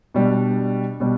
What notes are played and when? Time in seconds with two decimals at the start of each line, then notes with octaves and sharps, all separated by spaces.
0.14 B2 G3 D4
1.00 B2 G3 D4